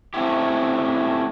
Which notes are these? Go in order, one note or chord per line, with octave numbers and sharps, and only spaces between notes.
A3 C4 C#4 E4 G4